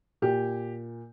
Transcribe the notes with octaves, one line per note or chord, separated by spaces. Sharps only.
A#2 G4